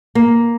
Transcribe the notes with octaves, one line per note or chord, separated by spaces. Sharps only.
A#3